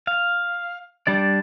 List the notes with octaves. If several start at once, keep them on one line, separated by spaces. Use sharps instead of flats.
F5
G3 D4 D5